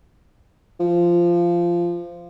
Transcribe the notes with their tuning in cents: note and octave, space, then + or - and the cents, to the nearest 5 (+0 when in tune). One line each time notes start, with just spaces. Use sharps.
F3 -15